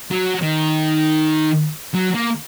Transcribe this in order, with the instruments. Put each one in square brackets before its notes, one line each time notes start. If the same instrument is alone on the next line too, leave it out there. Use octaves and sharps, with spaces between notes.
[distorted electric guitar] F#3
D#3
F#3
A#3